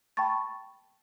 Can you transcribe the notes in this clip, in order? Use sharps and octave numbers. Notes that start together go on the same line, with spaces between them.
G5 A5 B5 C#6 A6